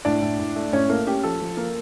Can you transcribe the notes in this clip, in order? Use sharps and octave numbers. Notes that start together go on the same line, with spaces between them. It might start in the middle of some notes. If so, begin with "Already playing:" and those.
A2 D4 D5
A2
A2
A3
A2 C#4 C#5
A3 A#3 A#4
C#4 G4
F3 A4
F3
A#3